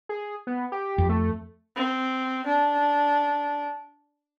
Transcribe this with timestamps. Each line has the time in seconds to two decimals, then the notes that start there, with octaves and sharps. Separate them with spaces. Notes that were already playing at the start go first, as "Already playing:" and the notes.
0.09 G#4
0.47 B3
0.72 G4
0.98 F2
1.09 A3
1.76 C4
2.46 D4